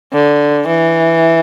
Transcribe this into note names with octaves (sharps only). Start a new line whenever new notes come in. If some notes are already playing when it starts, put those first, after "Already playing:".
D3
E3